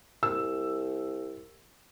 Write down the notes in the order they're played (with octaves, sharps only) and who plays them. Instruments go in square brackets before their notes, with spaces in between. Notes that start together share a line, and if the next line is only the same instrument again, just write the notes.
[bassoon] C2 [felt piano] E6